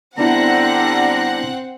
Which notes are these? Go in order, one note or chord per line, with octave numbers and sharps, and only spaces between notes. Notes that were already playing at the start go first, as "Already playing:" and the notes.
D3 G3 B3 C4 D4 E4 F#5 A#5